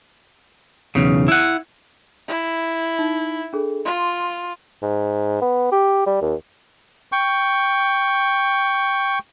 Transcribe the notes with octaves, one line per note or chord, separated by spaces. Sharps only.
B1 E2 C#3
E4 F#5
E4
D#4
D4 G#4 A4
F4 C6
G#2
B3
G4
G3
D#2
G5 C#6